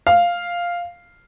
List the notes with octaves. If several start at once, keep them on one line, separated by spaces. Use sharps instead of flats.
F5